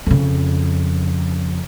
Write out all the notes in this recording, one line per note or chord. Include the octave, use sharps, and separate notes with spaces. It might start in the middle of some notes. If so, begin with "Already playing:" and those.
F2 C#3